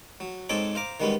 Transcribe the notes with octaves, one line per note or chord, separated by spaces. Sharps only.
F#3
G#2 C4 D#4 A4 C#5 D6
C5 F5 A#5 D6
D#3 G3 G#3 B3 C#4